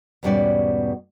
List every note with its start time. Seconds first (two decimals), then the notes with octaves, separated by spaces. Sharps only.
0.23 E2 G#2 B2 G3 C#4 D5